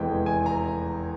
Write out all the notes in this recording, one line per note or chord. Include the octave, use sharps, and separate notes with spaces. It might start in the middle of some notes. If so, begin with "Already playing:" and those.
Already playing: F1 E2 E3 G#3 G5
G#5
A#5